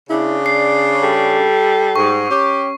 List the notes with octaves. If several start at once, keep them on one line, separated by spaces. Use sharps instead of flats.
C#3 D4 E4
D5 C7
G3 A4
G#2 C#6
C#4 G4